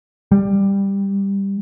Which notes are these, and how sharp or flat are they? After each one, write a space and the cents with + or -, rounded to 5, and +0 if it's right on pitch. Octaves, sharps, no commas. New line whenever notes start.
G3 +10